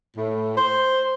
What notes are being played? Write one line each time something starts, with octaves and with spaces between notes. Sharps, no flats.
A2
C5